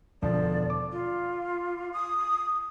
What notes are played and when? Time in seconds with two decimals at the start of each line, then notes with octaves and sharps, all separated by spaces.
0.22 E1 D3 F3 D5
0.70 D6
0.92 F4
1.93 D#6